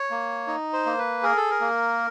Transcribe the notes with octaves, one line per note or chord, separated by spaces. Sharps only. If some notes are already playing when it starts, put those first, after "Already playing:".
Already playing: C#5
A#3
D#4
C5
A#3
B4
G#4 A#4
A4
A#4
A#3